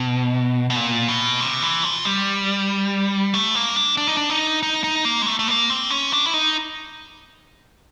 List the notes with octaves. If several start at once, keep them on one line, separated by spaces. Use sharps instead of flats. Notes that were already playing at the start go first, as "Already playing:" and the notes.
Already playing: B2
B2
A#2
B2
C3
E3
F3
G3
A3
A#3
D4
D4
D#4
D4
D#4
D#4
D#4
A#3
G#3
A3
A3
A#3
C4
C#4
D4
E4
D#4